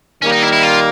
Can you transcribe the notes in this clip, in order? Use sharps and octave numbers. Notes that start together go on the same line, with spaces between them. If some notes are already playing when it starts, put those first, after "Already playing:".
D#3 G3 A#3 C#4
D#4
E4
E4
F4